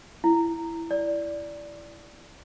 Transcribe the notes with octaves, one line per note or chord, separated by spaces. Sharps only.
E4
D5